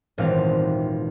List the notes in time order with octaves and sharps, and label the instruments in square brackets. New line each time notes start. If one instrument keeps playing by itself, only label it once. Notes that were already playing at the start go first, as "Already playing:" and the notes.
[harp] D#1 G#1 E3 C4 F5